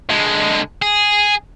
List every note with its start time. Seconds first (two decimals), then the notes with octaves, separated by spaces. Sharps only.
0.10 D3 G#3
0.82 G#4